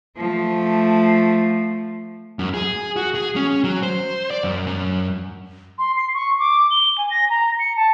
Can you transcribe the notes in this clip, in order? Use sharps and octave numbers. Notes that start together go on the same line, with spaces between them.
F3 A3
F#2
G#4
F#4
G#4
C#4
F#3
C5
D5
F#2
F#2
C6
C7
C#6
D6
G7
G#5
A#6
A#5
C#7
A5